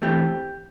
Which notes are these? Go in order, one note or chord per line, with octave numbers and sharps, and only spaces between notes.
E3 A3 C4 G4